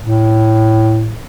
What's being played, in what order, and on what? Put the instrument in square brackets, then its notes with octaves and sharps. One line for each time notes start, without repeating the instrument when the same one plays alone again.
[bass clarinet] A2